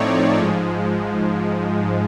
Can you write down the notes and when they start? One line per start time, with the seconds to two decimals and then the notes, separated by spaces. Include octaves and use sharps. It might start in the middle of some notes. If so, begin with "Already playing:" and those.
Already playing: A2 F3 A3 C4 D#4 C#5 D5
0.38 G#2 F3 G#3